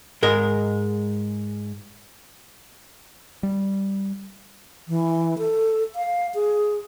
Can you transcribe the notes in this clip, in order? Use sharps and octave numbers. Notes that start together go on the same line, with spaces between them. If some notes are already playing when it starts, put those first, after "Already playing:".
G#2 G#3 A#4
G3
E3
A4
F5
G#4